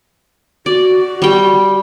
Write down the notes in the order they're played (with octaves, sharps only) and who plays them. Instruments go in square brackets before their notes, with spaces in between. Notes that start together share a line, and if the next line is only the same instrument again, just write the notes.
[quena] F#4 [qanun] D5
[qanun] G3 G5